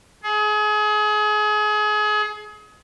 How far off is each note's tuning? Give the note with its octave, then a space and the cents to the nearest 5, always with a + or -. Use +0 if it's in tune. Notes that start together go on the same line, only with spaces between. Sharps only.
G#4 +30